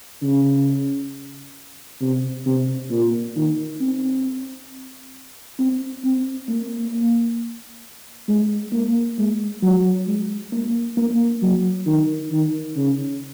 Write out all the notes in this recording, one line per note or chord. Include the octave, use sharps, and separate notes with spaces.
C#3
C3
C3
A#2
D#3
C4
C4
C4
A#3
G#3
A#3
G#3
F#3
G#3
A#3
A#3
F#3
D#3
D#3
C#3